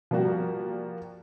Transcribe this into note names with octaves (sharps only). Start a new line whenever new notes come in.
F3 G3 A#3 F#4 G4